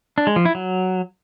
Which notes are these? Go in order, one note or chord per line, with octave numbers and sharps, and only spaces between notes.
D4
G#3
F3
E4
F#3